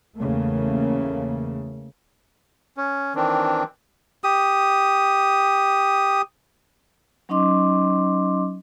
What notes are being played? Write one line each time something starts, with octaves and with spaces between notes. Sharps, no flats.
E2 C#3 A3 A#3
C#4
D#3 E3 C4 D4
G4 D#6
F#3 C#4 D#4 D#5 C6 D6